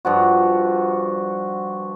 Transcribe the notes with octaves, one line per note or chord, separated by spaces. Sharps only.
G2 F3 F#4